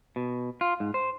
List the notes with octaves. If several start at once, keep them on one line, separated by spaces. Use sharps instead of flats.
B2
F4
G#2
C5